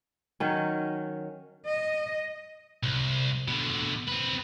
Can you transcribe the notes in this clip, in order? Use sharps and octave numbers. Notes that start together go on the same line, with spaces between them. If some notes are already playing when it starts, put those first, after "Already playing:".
D#3 F#3 C#4
D#5
C2
B2 D3
C4 B4